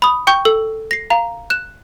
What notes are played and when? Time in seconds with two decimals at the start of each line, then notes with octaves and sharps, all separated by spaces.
0.02 B5 D#6
0.27 G5 C#6 G6
0.45 A4 E6
0.91 A#6 C7
1.10 F5 A#5
1.50 F#6 E7